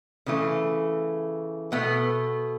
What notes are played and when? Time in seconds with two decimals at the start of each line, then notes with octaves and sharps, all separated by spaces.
0.26 C#3 E3 A3
1.72 B2 A3 B3